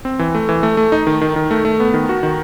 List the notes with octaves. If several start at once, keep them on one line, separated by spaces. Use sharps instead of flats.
C4
E3
A3
E3
A3
A3
D#4
D#3
D#3
D#3
A3
A3
B3
D#3
F#4
D#3